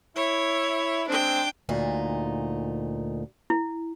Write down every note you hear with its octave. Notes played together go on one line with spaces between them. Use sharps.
E4 C#5
G#3 C4 D4 G5
D2 A#2 D#4
E4